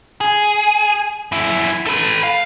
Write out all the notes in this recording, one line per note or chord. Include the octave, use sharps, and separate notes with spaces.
G#4
F#2 E4
A4 B4
F5